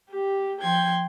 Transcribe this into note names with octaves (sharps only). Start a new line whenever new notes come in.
G4
F3 G5 C6 G#6